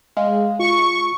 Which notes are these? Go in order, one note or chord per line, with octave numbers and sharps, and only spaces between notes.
G#3 F5
F4 C#6